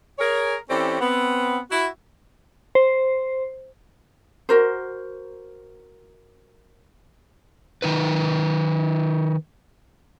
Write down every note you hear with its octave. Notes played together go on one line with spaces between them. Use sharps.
G#4 A#4 C#5
E3 C4 C#4 G4 A4 D5
B3 C4
E4 F#4
C5
F#4 A#4 C5
D#3 D#4 B4